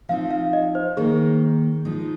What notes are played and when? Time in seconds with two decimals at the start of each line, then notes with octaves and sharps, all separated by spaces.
0.09 F3 C4 D#4 F5
0.31 F5
0.53 D#5
0.75 C5
0.97 D#3 A#3 D#4 G#4
1.85 F3 G#3 D#4